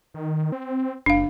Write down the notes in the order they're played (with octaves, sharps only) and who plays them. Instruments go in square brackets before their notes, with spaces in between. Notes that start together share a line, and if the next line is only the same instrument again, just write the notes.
[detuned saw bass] D#3
C4
[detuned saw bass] F#1 [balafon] D4 F5